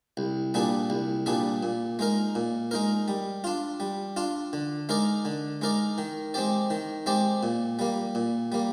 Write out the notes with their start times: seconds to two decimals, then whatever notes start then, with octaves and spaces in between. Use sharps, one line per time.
0.17 C2
0.54 A#2 G3 D4 G#4
0.90 C2
1.26 A#2 G3 D4 G#4
1.63 A#2
1.99 G#3 D#4 A#4
2.35 A#2
2.71 G#3 D#4 A#4
3.08 G3
3.44 D4 F4
3.80 G3
4.16 D4 F4
4.53 D3
4.89 G#3 D#4 A#4 D5
5.25 D3
5.61 G#3 D#4 A#4 D5
5.98 D#3
6.34 G#3 C4 G4 D5
6.70 D#3
7.06 G#3 C4 G4 D5
7.43 A#2
7.79 G3 A#3
8.15 A#2
8.52 G3 A#3